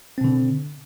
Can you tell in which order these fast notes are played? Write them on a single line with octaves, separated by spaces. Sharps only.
C4 B2 D3